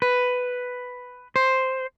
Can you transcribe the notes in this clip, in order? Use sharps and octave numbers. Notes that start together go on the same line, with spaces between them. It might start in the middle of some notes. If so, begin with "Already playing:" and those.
B4
C5